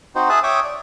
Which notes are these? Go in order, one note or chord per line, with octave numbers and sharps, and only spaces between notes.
C4 D#4 F#4 C5
G#4 E5 A5 D#6 F#6
C#5 E5 G5 D6 D#6
D5